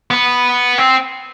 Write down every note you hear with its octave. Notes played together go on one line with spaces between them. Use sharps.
B3
C4